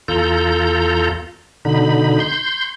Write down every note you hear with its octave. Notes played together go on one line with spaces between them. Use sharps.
E2 F4 A4 A#5 G6
B2 D3 D#4 B5
C6 G6